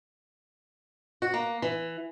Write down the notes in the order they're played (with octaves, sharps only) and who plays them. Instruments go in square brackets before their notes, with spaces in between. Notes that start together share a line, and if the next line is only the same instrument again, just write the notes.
[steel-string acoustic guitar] F#4
A#3
E3